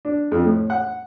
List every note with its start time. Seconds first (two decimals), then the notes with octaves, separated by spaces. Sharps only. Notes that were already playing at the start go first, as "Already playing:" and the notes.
0.05 D4
0.32 F2
0.45 A2
0.70 F#5